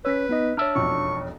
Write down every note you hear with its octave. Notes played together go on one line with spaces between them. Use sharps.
C#4 B4 C#5 E6 B6
B3 D#4 D#5
D4 C#5 E5 F6
E1 B1 F2 C#6